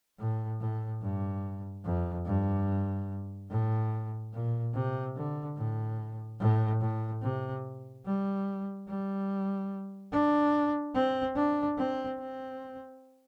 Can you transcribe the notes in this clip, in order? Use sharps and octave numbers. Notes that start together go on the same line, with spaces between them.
A2
A2
G2
F2
G2
A2
A#2
C3
D3
A2
A2
A2
C3
G3
G3
D4
C4
D4
C4
C4